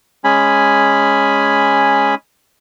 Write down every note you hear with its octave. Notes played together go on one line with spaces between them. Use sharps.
G#3 C#4 G#5 B5